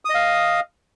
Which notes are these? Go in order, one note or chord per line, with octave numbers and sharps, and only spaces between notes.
D#5 F5 D#6